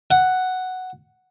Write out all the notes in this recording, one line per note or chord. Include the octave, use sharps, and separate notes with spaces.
F#5